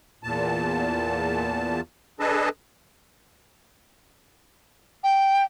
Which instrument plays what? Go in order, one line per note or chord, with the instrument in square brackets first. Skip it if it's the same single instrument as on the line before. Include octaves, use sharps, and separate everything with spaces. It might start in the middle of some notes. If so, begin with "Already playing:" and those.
[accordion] E2 A#2 A5
D4 G#4 A4 B4 D#5 A5
[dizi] G5